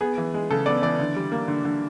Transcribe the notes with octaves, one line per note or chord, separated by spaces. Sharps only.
B3 G#4
E3
G#3
C#3 A4
B3 D5
E3 D5
D3
G3
A#3
D3
D3